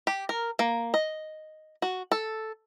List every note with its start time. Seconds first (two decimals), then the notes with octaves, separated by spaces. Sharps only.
0.07 G4
0.29 A#4
0.59 A#3
0.94 D#5
1.82 F#4
2.12 A4